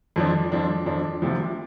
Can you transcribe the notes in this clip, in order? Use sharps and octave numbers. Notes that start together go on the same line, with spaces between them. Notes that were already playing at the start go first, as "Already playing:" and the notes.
F2 F3 D4
F2 F3 D4
F2 F3 D4
D2 C3 F3